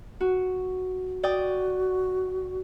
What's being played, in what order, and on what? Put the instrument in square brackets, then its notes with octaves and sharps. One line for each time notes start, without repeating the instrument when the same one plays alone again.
[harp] F#4
[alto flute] F#4 [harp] D5 G5 D#6